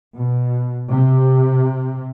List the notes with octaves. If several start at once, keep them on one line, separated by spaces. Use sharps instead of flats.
B2
C3